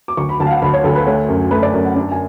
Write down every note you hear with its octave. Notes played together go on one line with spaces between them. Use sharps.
D6
D2 C#6
B5
D2 A5
F5
F#5
D2 B5
C#5
D2 A4
B4
A3 C#5
F#2
A3 B4
D5
F#2
F#5
D4
G#5